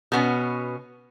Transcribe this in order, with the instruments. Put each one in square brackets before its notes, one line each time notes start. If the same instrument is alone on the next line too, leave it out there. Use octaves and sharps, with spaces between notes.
[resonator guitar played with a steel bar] B2 B3 C#4